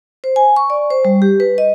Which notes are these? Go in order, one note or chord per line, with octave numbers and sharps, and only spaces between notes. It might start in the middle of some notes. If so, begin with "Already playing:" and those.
C5
G#5
C#6
D5
C5
G3
G4
B4
D#5